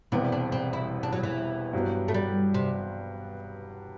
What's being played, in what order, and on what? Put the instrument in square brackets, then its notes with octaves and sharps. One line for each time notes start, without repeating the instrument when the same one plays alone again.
[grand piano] E1 E2 C3 G3 B3 [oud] D4
[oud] D4
C4
E4
D4
F#3
E3
[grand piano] G2 F#3 B3
[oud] A3
G3
C3